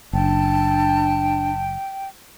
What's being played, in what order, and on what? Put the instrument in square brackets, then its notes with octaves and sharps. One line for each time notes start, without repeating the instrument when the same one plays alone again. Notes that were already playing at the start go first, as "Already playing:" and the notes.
[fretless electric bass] F#1 [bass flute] D4 [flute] G5 [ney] A5